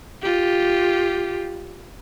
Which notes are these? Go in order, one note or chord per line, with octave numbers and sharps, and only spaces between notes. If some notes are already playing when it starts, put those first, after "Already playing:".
F4 G4